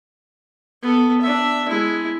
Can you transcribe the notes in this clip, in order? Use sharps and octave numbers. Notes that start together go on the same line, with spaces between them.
B3 A4
D4 E5
G#3 E4